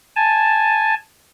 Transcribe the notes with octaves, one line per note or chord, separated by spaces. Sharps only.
G#5 A5